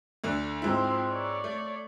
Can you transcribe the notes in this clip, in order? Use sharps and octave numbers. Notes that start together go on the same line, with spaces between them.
D2 D3
G#2 F3 C4 E4
C#5 D5
A3